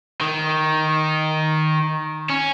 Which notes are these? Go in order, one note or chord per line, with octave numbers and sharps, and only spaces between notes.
D#3
C#4